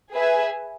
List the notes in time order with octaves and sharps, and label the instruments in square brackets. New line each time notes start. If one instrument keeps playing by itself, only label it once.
[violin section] G#4 B4 E5 G#5